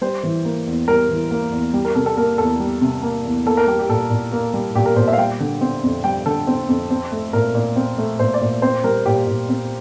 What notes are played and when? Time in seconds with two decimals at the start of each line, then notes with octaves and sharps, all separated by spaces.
0.01 G3 C5
0.23 E3
0.45 A#3
0.67 E2
0.88 G3 A#4
1.10 E3
1.31 A#3
1.52 E2
1.74 G3
1.85 A#4
1.95 C3 A4
2.06 A4
2.17 A#3 A#4
2.38 E2 A4
2.60 G3
2.81 C3
3.03 A#3
3.25 E2
3.46 A#3 A4
3.57 A#4
3.67 G3 G4
3.79 G4
3.89 A#2 A4
4.10 A#2
4.32 A#3
4.54 G3
4.75 A#2 G4
4.86 A#4
4.96 A#2 C5
5.08 E5
5.13 F5
5.18 G3 G5
5.40 D3
5.61 C4
5.83 F2
6.04 G3 G5
6.26 D3 A4
6.47 C4
6.69 F2
6.90 C4
7.12 A3
7.33 A#2 A#4
7.55 A#2
7.76 C4
7.98 A3
8.19 A#2 C5
8.34 D5
8.41 A#2
8.62 C4 C5
8.84 G3 A#4
9.05 A#2 G4
9.27 A#2
9.49 C4